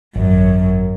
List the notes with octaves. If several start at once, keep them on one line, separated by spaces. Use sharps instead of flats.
G#1 F#2